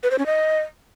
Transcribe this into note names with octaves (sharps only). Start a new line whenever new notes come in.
B4
C5
C#4
D#5